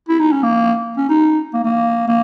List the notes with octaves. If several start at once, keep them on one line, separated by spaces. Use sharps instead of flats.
E4
D#4
C#4
A#3
C#4
D#4
A#3
A#3
A#3